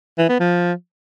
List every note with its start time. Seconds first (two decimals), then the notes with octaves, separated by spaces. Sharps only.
0.18 E3
0.29 B3
0.40 F3